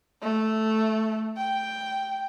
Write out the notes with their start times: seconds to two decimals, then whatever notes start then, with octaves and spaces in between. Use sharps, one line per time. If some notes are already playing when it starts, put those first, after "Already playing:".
0.22 A3
1.37 G5